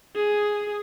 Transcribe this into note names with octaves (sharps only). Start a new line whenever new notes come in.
G#4